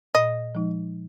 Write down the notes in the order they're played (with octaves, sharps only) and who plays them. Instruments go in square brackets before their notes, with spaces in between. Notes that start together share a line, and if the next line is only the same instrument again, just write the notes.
[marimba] A#2 [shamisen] D#5
[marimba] F3 G#3 D#4